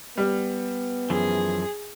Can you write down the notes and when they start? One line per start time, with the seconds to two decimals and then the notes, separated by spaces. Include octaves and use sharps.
0.17 G3 B3
1.10 F#2 E3 F3 G#4